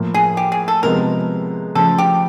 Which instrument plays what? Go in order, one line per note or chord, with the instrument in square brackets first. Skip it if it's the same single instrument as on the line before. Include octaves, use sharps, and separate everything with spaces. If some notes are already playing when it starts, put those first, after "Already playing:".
Already playing: [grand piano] A2 F3 A#3
[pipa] G#4
G4
G#4
A4
[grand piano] C3 F3 G#3 B3 [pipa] A#4
[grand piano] C#3 F3 A3 [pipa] A4
[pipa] G4